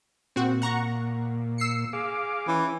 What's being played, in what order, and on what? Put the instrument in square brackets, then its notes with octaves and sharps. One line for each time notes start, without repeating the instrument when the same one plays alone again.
[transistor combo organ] A#2 [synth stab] C4 F#4
[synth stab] F#5 A#5 C#6
E6 C7 C#7
[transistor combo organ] G#4 F5 D6
[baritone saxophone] E3 [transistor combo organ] C#4